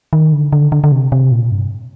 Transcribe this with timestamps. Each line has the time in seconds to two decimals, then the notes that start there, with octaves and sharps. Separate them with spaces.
0.13 D#3
0.32 D3
0.52 D3
0.72 D3
0.84 D3
0.92 C3
1.12 C3
1.32 A#2
1.52 G2